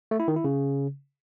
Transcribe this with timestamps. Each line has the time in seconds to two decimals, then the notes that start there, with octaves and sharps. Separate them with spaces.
0.11 A3
0.20 E4
0.28 D#3
0.36 E4
0.44 C#3